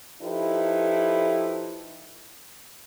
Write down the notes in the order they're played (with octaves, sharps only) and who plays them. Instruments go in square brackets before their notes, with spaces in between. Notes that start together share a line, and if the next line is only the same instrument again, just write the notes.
[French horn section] F3 D#4 E4 G4 A4 B4